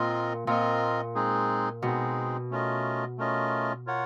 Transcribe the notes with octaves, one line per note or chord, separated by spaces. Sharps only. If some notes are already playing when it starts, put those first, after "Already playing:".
Already playing: A#2 C4 F4 A#4 D#5
A#2 C4 F4 A#4 D#5
G#3 C4 D#4 G#4
B2 G#3 C4 D#4 G#4
A3 C#4 F4 A#4 D#5
A3 C#4 F4 A#4 D#5
F4 A#4 C#5 F#5